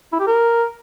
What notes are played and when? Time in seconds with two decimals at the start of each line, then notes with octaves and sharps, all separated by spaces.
0.13 E4
0.20 G4
0.27 A#4